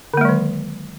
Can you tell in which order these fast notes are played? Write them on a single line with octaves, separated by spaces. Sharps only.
D3 A#3 G#3 F#3 D#3